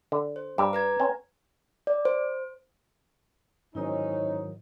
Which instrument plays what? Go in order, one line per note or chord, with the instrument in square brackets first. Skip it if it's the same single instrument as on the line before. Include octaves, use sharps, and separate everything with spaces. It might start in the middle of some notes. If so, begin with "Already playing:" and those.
[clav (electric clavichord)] D3
[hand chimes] C5
[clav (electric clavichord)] G2 G4 D5 [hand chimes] A#5 D6
[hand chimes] B4 A#5 G#6
[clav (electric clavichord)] C4 C#4
[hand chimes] D5
C5
[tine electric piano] G#2 D#3 F#3 [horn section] C#4 D#4 [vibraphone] E4 C5 D#5